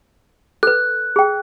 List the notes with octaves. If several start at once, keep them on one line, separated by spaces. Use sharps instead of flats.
A4 B4 F#6
G#4 G5